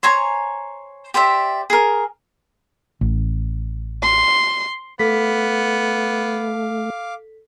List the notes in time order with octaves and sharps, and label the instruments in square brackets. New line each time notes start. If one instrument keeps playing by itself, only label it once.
[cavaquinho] C5 C#5 G#5 A#5
G4 C5 D5 E5
G#4 A#4
[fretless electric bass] A1
[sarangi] C6
[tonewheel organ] A3 [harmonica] B3 [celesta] A4 B6 [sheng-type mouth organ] F5 D6